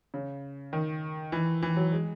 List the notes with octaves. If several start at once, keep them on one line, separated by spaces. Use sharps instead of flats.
C#3
D#3
E3
E3
F#3
G#3